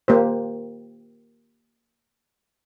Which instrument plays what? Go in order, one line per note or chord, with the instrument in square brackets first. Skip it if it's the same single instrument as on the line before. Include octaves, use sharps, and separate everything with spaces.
[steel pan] A#3 G4 C5